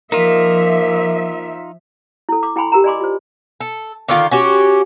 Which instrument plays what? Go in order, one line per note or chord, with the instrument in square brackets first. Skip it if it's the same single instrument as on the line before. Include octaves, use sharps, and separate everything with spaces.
[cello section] F3 E5 [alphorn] A#3 [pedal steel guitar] D#4 F4 [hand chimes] A#4
[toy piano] E4 A4
D6
E4 G5 G#5 B5 C6
G4 A#4 G5 A#5
D5 D#5 G#5 B5 C6 D6
F4 C5
[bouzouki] A4
D3 D#3 F4
C#4 F#4 G4